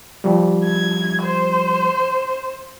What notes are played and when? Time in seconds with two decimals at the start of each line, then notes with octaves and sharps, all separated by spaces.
0.24 F3 G3
0.64 G#6
1.22 C5